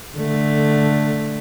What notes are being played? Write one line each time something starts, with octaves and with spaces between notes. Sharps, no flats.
D3 A3